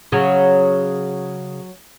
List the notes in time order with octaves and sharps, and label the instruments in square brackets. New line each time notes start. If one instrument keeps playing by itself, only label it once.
[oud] C#3 F#3